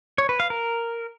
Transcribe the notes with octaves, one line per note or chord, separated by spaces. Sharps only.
C#5
B4
F5
A#4